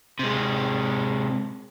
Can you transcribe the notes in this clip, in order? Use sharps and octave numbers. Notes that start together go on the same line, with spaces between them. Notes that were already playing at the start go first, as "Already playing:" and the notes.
C3 G#3